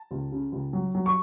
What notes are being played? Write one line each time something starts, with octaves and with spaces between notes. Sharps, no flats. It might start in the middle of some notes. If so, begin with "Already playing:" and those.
Already playing: A5
C#2
C#3
C#2
F#3
F#3
C#6